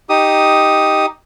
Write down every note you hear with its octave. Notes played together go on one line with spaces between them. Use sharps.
D#4 G4 D#6